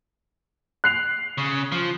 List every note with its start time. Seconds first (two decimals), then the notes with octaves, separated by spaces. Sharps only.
0.84 F#6 C7 F7
1.38 C#3
1.72 F3